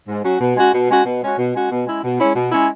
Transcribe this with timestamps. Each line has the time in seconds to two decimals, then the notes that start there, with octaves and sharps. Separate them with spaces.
0.08 G#2
0.24 F#3 C#4 F#4
0.40 B2
0.57 G#3 C#4 F#4
0.73 B2
0.90 G#3 C#4 F#4
1.05 B2
1.22 G#3 C#4 F#4
1.38 B2
1.54 G#3 C#4 F#4
1.71 B2
1.86 G#3 C#4 E4
2.03 B2
2.20 G#3 C#4 E4
2.36 B2
2.52 G#3 C#4 E4